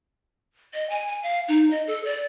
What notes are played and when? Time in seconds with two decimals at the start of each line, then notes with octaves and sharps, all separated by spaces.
0.74 D#5
0.90 G#5
1.07 G#5
1.23 F5
1.48 D#4
1.71 D#5
1.87 A4
2.05 D5